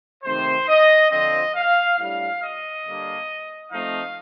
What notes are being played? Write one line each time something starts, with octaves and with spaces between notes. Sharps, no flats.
C3 D#3 A3 C4 C5
D#5
D3 F3 C4 D#5
F5
A2 G3 D4 F5
D#5
D3 G3 A#3 D4
F3 A3 C4 D#4 F5